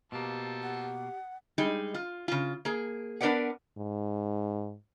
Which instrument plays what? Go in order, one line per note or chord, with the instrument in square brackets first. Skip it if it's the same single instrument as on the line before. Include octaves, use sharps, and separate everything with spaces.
[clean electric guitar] B2 A#3 [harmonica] F3 A4 A5 [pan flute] G4
[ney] F#5
[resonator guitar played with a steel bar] G3 G#3 D#4
F4
C#3 F4
A#3 G#4
B3 D4 A#4 B4 D5 F#5
[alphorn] G#2